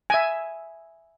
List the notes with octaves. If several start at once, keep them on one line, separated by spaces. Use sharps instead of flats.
E5 G#5